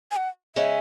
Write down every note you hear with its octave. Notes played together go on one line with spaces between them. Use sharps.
G#5
F#5
C#3 G#3 C#4 E5